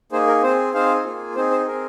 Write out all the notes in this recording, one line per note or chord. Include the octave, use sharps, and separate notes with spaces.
A#3 D#4 G#4 C5
A#4
C4 G#4 C5
C4 D#4 G#4 C5 F5
A#3 F4 G#4
C4 D#4 G#4 C5
C5
C4 G#4 A#4